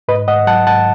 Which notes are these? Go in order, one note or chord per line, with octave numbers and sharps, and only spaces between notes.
G#2 B4 D#5
G#2 D#5 F#5
F#3 F#5 A5
G#2 F#5 A5